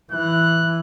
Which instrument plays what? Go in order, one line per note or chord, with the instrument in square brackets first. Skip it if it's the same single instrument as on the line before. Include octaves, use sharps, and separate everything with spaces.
[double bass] E3 [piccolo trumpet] F#6